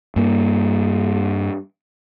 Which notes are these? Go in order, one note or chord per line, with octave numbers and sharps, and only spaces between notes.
G2 A#3